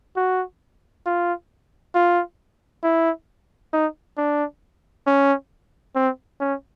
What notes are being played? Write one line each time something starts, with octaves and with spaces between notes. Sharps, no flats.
F#4
F4
F4
E4
D#4
D4
C#4
C4
C#4